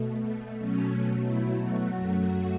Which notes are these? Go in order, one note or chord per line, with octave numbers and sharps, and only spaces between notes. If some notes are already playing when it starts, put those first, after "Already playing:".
Already playing: B2 A3
B2 F#3 A3 C#4
E4
F#4
F#2 F#3 A3